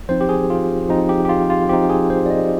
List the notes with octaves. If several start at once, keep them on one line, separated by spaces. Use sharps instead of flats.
F3 C4 D#4 C5
G4
G#4
F4
F3 C4 D#4
G4
G4
F4
F4
F3 C4 D#4 G4
G#4
C5
D5
D#5